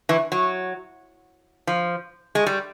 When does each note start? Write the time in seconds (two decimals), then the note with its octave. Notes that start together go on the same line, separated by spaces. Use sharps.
0.09 E3
0.32 F#3
1.67 F3
2.35 G#3
2.46 G3